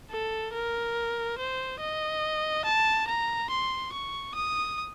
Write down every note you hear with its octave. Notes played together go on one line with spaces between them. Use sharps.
A4
A#4
C5
D#5
A5
A#5
C6
C#6
D#6